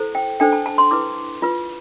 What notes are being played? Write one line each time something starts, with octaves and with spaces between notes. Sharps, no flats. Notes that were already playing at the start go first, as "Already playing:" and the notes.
Already playing: E4 A4 C5
G5
D4 A4 C5 G5
A5
A5
C6
E4 B4 D6
F4 B4